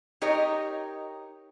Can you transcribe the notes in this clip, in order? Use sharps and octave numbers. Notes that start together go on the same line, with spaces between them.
D#4 G4 A#4 C#5 D#5